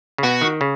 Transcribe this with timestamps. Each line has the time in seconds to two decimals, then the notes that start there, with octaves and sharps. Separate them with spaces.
0.18 C#3
0.23 B2 F#4
0.41 D#3
0.61 C#3